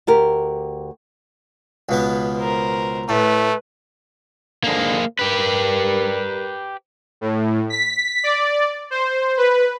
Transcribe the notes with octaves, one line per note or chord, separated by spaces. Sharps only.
D2 G4 A#4
C#2 B2 B3
A#4 C5
A2 A3 B4
F2 G#2 D3 A#3 G#4
G3 G4 A#4 B4
A2
B6
D5
C5
B4